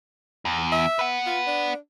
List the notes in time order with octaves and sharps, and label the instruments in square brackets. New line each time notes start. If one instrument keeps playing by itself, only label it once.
[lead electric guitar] E2
[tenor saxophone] E5
[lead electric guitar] B4 F#5
[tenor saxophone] F4
D4